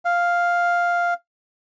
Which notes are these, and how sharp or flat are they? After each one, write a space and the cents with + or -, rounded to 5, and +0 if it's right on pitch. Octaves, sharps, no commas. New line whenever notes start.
F5 +0